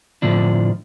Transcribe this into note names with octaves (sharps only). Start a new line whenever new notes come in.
A2 D3 F3 D4